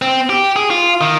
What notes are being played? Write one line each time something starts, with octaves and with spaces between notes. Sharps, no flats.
C4
G4
G#4
F4
D#3